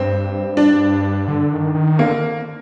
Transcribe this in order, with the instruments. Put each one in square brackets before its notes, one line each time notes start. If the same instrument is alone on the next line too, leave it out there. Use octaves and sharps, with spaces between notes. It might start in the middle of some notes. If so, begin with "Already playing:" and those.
Already playing: [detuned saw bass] G2 [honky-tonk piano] C4
[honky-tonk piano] D4
[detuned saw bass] D3
D#3
D#3
[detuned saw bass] D3 [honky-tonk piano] A#3